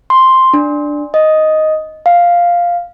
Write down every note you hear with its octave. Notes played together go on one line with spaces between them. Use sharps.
C6
D4
D#5
F5